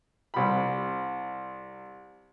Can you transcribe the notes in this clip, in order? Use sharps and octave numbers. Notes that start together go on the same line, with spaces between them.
C2 B5